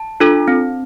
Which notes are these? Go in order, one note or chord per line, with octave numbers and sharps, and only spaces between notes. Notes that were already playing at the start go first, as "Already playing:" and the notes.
Already playing: A5
D4 F4 A4
C4